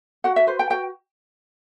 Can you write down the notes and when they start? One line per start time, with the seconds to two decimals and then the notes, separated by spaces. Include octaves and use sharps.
0.24 F#4 F#5
0.36 E5
0.47 B4 C5
0.59 G5
0.70 F#4 G5